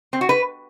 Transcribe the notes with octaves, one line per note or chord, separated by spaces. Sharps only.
C4
F#4
B4